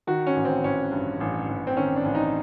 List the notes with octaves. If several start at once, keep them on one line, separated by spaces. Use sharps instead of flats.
D#3 F#4
C#4
A1
C4
A1 C#4
G2
A1
A1
C4
D#3 C#4
D4
A1
D#4